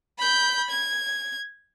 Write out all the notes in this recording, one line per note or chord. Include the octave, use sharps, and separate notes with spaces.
B5 G6
G#6